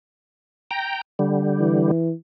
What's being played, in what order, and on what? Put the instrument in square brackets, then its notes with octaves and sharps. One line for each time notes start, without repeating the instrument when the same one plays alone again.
[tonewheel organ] G5 A#5
D3 G3
[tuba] E3